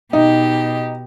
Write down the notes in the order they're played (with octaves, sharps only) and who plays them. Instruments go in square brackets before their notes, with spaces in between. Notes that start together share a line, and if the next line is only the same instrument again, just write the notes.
[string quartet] B2 G4 [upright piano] D#4